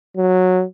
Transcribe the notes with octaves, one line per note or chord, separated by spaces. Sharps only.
F#3